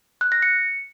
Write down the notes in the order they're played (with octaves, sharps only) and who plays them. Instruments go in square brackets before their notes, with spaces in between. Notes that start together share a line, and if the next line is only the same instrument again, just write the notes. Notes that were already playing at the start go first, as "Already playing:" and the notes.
[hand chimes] F#6
A#6
C#7